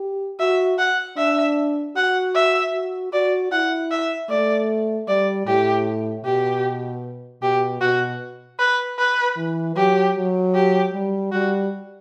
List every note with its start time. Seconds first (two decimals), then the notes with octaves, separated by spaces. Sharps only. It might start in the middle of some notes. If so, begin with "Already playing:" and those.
Already playing: G4
0.39 F#4 E5
0.78 F#5
1.17 D4 E5
1.96 F#4 F#5
2.35 E5
2.74 F#4
3.12 F#4 D5
3.52 E4 F#5
3.91 E5
4.29 A3 D5
5.08 G3 D5
5.46 A2 G4
6.25 B2 G4
7.42 B2 G4
7.81 B2 F#4
8.59 B4
8.98 B4
9.37 E3
9.76 F#3 G4
10.16 F#3
10.55 G4
10.94 G3
11.32 G3 F#4